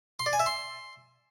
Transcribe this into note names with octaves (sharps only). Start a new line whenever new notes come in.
C6
D5
G#5
E5
C6